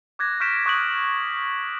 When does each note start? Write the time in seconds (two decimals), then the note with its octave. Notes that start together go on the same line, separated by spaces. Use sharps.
0.19 D6 F#6 G#6 A#6
0.40 C#6 F6 G6 B6 D7 E7
0.66 C#6 D#6 F#6 G6 D7 F#7